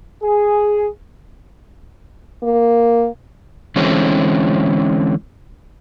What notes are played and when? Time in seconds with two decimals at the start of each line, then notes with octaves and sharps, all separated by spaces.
0.22 G#4
2.43 A#3
3.76 D3 E3 G#3 C4 C#4